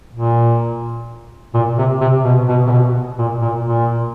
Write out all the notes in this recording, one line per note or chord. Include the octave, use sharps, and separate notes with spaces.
A#2
A#2
C3
C3
B2
B2
C3
B2
A#2
A#2
A#2